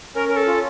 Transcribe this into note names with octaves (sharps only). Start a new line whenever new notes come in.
C#4 A#4
A#4
A4
F4